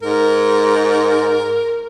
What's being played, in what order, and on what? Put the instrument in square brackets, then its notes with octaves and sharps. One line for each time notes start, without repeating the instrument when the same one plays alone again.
[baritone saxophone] G#2 [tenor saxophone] A#4